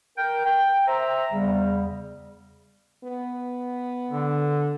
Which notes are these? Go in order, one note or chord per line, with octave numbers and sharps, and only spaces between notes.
A#4 G5
G5
C5 E5 A#5
E2 C#3 G3
B3
D3